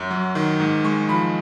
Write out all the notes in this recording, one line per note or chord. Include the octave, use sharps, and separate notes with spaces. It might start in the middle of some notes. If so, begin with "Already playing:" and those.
Already playing: F#2
F#3
D#3
G#2
G#3 C#6
F3 B5